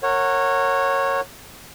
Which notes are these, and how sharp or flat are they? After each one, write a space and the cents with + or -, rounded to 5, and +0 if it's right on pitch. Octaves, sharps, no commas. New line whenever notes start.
A#4 -25 C#5 -15 F#5 +0